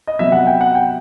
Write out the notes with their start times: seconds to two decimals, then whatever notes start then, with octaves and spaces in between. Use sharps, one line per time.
0.07 D#5
0.19 C3 F#3 B3 E5
0.32 F#5
0.47 G5
0.61 F#5
0.75 G5